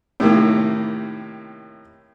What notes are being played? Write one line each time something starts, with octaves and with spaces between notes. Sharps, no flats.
A2 C3 D#3 A#3